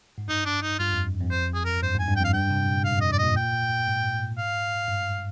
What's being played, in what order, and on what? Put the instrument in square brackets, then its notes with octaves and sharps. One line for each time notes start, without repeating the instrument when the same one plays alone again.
[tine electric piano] G#2
[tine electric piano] G2 [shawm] D#4
[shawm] D4
D#4
[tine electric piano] G2 [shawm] F4
[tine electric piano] F2
F2
[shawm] C5
G#4
A#4
[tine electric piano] G2 [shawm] C5
[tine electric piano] G#2
[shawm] G#5
[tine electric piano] G2
[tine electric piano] F2 [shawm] G5
[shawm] F5
[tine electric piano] G2 [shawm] G5
[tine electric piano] C3
A#2
[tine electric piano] G#2 [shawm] F5
[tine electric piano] F2 [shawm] D#5
[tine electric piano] G2 [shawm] D5
[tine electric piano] A#2 [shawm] D#5
[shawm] G5
[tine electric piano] G#2
[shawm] F5
[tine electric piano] G2